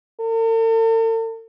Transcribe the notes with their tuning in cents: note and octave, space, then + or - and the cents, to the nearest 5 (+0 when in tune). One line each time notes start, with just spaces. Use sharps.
A4 +45